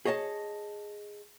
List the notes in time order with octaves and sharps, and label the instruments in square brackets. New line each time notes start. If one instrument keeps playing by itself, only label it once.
[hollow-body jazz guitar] G#4 C#5 D#5 E5 A5